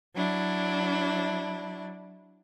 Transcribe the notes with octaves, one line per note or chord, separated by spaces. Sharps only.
F#3 D4 E4